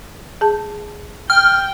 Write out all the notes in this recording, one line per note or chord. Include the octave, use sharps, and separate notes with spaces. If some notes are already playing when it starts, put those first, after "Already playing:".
G#4 A5
G5 F6